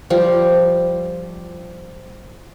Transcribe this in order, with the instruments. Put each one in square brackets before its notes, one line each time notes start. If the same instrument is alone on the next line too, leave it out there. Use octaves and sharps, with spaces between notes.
[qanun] F3 G3